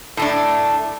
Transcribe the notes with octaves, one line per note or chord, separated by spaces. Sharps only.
A2 A3 D4